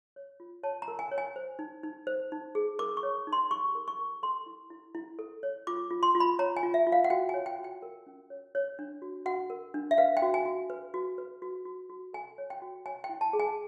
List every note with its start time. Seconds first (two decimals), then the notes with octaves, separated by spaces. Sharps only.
0.16 C#5
0.40 F4
0.63 C#5 A5
0.82 A#5
0.88 A#4
0.99 G#5
1.11 C#5
1.18 G#5
1.36 C5
1.59 D#4
1.83 D#4
2.07 C5
2.32 D#4
2.55 G#4
2.79 A#4 D6
2.97 C#6
3.03 C#5
3.27 D#4
3.33 C6
3.51 G4 C#6
3.75 A#4
3.88 C#6
3.99 A#4
4.23 A4 C6
4.46 E4
4.70 E4
4.95 E4
5.19 A4
5.43 C#5
5.67 F4 D6
5.91 F4
6.03 C6
6.15 F4
6.20 B5
6.39 C#5 A#5
6.57 G#5
6.63 F4
6.74 E5
6.87 F4
6.92 F5
7.04 F#5
7.10 F#4 G5
7.29 G#5
7.34 C#5
7.46 G5
7.58 F#4
7.64 G5
7.82 A#4
8.07 C#4
8.30 C#5
8.55 C#5
8.79 D4
9.02 F#4
9.26 F#4 F#5
9.50 A#4
9.74 D4
9.91 E5
9.98 B4 F5
10.17 G5
10.22 F#4
10.34 G#5
10.45 F#4
10.70 B4
10.94 F#4
11.18 B4
11.42 F#4
11.65 F#4
11.90 F#4
12.13 A4 G#5
12.38 C#5
12.50 G5
12.62 F#4
12.86 C#5 G#5
13.04 G5
13.09 E4
13.21 A5
13.33 G#4
13.40 G#5